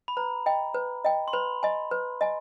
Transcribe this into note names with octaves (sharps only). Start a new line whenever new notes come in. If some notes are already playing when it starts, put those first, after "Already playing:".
B5
B4 A#5
D#5 G5
B4
D#5 G5
C6
B4 B5
D#5 G#5
B4
D#5 G#5